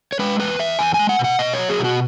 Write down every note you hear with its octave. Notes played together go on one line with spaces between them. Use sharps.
C#5
G#3 B4
E2 B4
E2 E5
E2 G#5
G#5
G#3
F#5
B2
F#5
B2 D#5
C#5
F#3
G#4
B2
F#4